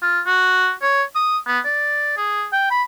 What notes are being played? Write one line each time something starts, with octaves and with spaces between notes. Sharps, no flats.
F4
F#4
C#5
D#6
B3
D5
G#4
G5
B5